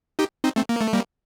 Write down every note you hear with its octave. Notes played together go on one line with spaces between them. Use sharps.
D#4 G4
C4 D#4
A3 C4
A#3
A3
G3 A#3